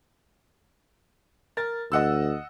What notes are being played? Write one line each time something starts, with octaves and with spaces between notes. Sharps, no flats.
A#4 A6
D2 D#5 F#5 E6